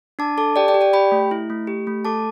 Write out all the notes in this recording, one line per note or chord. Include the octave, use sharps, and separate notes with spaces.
D4 A5 D6
A4 A5 D6
G4 D5 G5
D5 G5
G4
D5 G5
G4 G5 B5
A3
E4
A3
G4
A3
A4 A5 D6